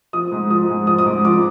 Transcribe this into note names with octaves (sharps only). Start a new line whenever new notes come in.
F3 D#6
G#2
F3 D#6
G#2
F3 D#6
D#6
G#2 D6
F3 D6